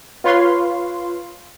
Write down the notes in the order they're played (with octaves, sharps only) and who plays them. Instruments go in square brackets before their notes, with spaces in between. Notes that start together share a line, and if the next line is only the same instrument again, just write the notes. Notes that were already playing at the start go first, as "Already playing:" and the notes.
[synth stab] F4 B4 C#5 F5 C6